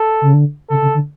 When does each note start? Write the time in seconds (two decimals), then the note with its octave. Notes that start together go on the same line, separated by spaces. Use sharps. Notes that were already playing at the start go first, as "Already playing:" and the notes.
Already playing: A4
0.21 C#3
0.34 D3
0.70 C#3 A4
0.82 C#3
0.94 D3